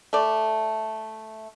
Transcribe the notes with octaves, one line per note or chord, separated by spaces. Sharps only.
A3 D5